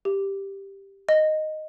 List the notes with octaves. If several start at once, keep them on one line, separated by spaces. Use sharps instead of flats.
G4
D#5